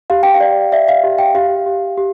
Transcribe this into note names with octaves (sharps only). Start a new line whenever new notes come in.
G4 F5
G5
F5
D5
D5 E5
F5
G4
G5
G4 F5
G4
G4